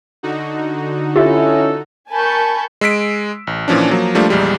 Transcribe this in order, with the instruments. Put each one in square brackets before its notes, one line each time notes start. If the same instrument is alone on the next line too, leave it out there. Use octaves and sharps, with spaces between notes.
[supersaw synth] D3 D#4 F#4
[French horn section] C#4 E4 [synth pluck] F4 G4 E5 [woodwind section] A4
[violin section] A#4 G#5 A5 B5 C#6 G6
[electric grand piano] G#3 E6 B6 D7
A1
A#2 E3 F3 C#4 D4
F3 F#3 A#3
F3 G3 A3 A#3 D4 F4
A#1 E2 G3 G#3